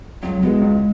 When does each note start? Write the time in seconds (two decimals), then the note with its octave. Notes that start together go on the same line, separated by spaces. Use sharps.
0.23 C#2 F#3
0.42 B2 G#3 B3 E4 G#4
0.62 C#2